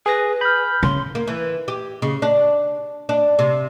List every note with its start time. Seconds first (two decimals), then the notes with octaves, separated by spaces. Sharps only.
0.06 G#4 B4 A#6
0.41 B5 F6 G6
0.83 C#3 C6
1.15 A#3
1.27 E3
1.68 G4
2.02 C#3
2.22 D4
3.09 D4
3.39 C3